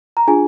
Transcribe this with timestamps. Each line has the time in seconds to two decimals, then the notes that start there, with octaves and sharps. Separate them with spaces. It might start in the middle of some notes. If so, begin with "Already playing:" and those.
0.17 A#5
0.27 D4 F4 G#4 G#5